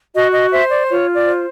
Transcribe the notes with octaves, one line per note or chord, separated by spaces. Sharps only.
F#4 D#5
D#5
C5 E5
D5
F4 C#5
D5
C5